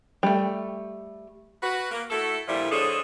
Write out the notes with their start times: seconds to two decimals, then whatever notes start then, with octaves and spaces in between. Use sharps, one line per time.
0.23 G3 A3
1.63 F#4 B4
1.92 A#3
2.11 A3 E4 F#4 A4
2.48 A#2 D3 F3 G3 E4
2.72 D3 F3 G#3 G#4 A4 C#5